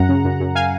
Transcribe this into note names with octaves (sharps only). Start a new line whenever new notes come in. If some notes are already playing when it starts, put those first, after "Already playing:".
Already playing: F#2 F#5 A#5
C#3
F#2
F#2
F5 G#5